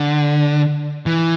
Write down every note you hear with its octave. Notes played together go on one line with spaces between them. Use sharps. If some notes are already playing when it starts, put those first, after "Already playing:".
Already playing: D3
E3